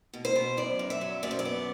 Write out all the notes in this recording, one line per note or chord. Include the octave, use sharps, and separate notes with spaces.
B2
C5
B2
F#2 D5
F#2
E5
F#3
F#2 D5
C5
D5
B3